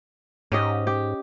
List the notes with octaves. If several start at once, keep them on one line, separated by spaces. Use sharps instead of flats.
G#2 C#4 G4 D#5
G4